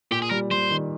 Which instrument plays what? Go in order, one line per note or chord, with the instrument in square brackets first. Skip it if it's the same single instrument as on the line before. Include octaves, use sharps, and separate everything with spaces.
[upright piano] A#2 [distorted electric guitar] G4
[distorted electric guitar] G#4
[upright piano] G3 [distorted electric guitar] A#4
[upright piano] G3 [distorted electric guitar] C5
[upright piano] D#3